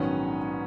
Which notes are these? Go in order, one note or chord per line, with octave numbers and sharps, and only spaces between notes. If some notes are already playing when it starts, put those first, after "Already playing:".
Already playing: A#1 G#2 D#3 F#3 B3 C#4